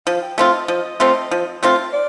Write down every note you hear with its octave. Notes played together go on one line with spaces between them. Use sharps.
F3 F5
G5
A3 C4 F4 F5
D#5
F3 D#5
A3 C4 F4
F3
A3 C4 F4
D5